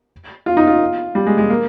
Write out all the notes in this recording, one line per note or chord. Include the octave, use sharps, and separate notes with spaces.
F4
D#4
F4
G3
G#3
G#3
A#3